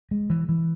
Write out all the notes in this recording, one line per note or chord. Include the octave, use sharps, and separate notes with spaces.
G#3
E3
E3